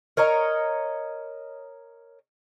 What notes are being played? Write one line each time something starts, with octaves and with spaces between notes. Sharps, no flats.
A#4 C#5 D#5 A#5